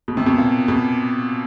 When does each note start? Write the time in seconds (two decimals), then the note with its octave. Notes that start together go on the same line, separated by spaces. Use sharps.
0.08 B2
0.17 C3
0.26 B2
0.38 A#2
0.68 B2